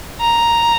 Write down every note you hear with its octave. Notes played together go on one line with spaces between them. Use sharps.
A#5